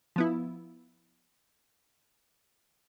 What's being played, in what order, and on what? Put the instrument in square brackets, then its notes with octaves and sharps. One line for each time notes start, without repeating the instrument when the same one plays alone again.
[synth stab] F3 B3 E4